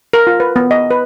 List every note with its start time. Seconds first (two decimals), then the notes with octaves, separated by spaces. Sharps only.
0.13 A#4
0.27 F4
0.40 B4
0.56 B3
0.71 D#5
0.91 B4